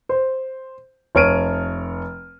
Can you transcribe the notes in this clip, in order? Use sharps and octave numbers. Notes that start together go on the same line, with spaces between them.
C5
F1 C#5 F6 D7 D#7